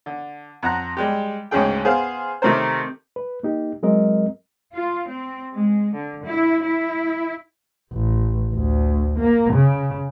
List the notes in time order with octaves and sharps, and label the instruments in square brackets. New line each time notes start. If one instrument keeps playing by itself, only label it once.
[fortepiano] D3
F2 F#5 A#5 F#6
G3 G#3 G4
D2 G#2 C#3 C#4 G#4 G5
B3 G#4 C5 F5
C3 D#3 A3 C4 A#4 C5
[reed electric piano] B4
A#3 D#4 G4
F#3 G#3 C4 A#4 D#5
[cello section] F4
C4
G#3
D3
E4
E4
[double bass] A1
D2
A#3
C#3